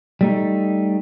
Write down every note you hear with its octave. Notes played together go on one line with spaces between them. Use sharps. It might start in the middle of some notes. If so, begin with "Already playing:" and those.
G3 A3 D#4